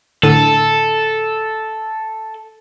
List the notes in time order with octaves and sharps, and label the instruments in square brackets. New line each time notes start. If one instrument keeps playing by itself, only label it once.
[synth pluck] A2 D3 D#7 [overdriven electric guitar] A4